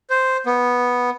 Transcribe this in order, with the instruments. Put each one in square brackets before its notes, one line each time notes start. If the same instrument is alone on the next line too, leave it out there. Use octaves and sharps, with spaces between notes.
[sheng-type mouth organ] C5
B3